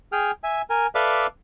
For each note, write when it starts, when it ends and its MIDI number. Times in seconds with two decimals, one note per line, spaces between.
0.12 0.31 68
0.12 0.31 79
0.12 0.31 80
0.12 0.31 89
0.44 0.62 76
0.44 0.62 80
0.70 0.87 70
0.70 0.87 80
0.95 1.27 69
0.95 1.27 71
0.95 1.27 74
0.95 1.27 76
0.95 1.27 77
0.95 1.27 86